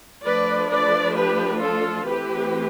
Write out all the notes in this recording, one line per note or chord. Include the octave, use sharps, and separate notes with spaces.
F3 A3 D4 B4 D5
B4 D5
G4 B4
F4 A4
E3 A3 C4 G4 B4